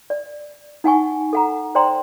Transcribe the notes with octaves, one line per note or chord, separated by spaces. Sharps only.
D5
D#4 F#5 G#5 C#6
A4 F#5 A#5
C5 D5 G5 A#5 C6